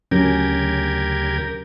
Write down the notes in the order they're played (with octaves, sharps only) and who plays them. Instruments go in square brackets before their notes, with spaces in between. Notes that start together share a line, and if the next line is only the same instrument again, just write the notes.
[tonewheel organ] D2 C#3 G#6 [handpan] F#3 C#4 [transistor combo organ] G4 A#4